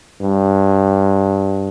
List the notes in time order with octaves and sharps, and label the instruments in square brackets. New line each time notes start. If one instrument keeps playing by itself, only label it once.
[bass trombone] G2